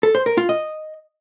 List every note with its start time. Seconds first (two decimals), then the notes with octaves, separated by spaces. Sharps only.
0.03 A4
0.15 C5
0.26 A#4
0.37 F4
0.49 D#5